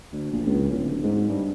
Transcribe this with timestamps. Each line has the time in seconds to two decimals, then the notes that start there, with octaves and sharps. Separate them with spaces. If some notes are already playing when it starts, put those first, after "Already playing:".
0.12 D2
0.32 A#1
0.47 C#2
0.70 D1
1.03 G#2
1.29 G2